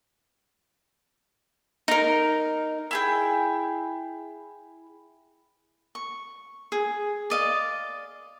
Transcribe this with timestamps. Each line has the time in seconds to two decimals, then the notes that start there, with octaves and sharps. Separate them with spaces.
1.88 D#4 A#4
2.91 E4 G#4 G5
5.95 C#6
6.72 G#4
7.30 D5 D#5 F5